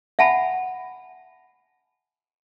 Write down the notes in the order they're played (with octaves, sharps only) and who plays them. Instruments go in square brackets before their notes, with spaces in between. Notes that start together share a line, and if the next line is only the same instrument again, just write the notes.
[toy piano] E5 F#5 G#5 A5 B5